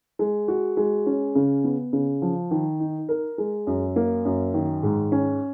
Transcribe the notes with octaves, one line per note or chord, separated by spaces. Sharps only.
G#3
F#4
G#3
C#4
C#3
B3
C#3
F3
D#3
D#4
A#4
G#3
F#2
A#3
F#2
D#3
G#2
C#4